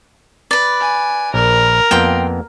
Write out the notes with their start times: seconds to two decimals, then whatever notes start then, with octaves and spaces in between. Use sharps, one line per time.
0.51 B4 D5
0.81 G#5
1.34 A#1 A#4
1.91 F2 A#3 B3 G5 C6